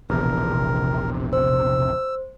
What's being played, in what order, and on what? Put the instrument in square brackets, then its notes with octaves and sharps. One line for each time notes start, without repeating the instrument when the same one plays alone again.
[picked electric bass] E1 A#1 E2 [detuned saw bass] C3 [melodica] A#4
[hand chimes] C5 [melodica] E6